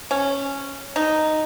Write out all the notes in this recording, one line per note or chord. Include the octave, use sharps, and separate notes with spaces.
C#4
D#4